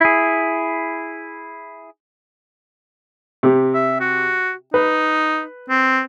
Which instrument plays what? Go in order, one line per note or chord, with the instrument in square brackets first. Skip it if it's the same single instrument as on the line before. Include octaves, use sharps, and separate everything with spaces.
[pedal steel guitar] E4 G#4
[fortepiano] C3 G4
[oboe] E5
F#4
[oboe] D#4 [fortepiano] B4
[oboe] C4